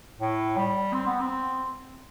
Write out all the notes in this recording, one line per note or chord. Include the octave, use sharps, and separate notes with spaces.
A2
G3
C4
B3
C4